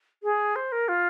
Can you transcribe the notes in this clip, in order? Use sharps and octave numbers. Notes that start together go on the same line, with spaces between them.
G#4
C5
A#4
F4